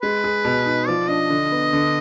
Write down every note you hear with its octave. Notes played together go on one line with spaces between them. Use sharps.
G#3 B4
G#4
B2
D#4
F3 D5
D4 D#5
D3
B3
D3